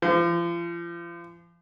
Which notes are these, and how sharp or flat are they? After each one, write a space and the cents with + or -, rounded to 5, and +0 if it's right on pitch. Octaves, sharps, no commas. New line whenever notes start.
F3 -35